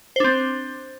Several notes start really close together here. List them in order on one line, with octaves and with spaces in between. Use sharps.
C5 D4 C4